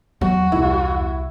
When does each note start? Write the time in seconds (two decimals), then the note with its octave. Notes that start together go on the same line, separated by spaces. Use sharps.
0.21 E2 F#3 F#4
0.52 C2 E4